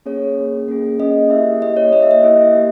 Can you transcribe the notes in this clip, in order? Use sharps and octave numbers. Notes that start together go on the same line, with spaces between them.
A#3 C#4 G#4 C#5
A#3 C#4 G#4
A#3 C#4 G#4
A#3 C#4 G#4 D#5
A#3 E4 G4 E5
A#3 E4 G4 D#5
C#5
A#3 E4 G4 D#5
E5
D#5
A#3 E4 G4 E5
A#3 G4